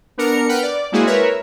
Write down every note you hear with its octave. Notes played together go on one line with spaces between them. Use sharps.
B3 D4 A#4 C#7
B4 F#5 G5 F6
D5
G#3 A#3 C4 E4 F#4 G#4
A#4 B4 C#5 E5